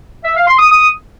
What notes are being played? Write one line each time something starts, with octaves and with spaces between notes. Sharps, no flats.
E5
F5
C6
D#6
D#6